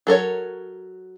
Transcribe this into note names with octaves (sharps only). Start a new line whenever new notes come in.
F#3 A4 A#4 C#5